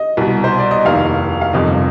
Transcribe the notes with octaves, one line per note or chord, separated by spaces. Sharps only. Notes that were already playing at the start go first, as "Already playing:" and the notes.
Already playing: D#5
C2 B2
C5
D5
D#5
F1 D#2 D#3 F5
F5
G1 F2 C3 D#3 D#5